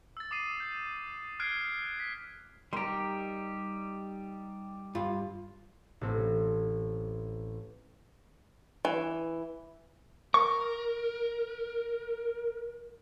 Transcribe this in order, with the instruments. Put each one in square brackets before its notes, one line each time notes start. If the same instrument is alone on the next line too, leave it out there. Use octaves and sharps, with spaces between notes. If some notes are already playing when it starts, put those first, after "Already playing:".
[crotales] E6 A6
D6 D#6 C7 D#7
G6
F6 F#6 G#6 C7 D7
B6
[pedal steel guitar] G3 G4 [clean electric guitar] D#4 A#4 [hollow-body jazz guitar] A#5 C6
[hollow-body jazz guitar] G2 F4
[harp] A1 C4
[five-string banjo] E3
[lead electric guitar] A#4 [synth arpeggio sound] C#6